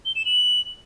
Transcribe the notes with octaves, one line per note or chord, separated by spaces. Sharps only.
G7
E7
F#7